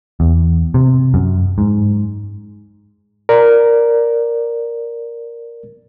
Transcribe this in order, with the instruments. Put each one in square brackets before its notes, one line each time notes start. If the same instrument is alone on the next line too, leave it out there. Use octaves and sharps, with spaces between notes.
[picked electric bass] E2
C3
F#2
G#2
[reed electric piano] A#4 D5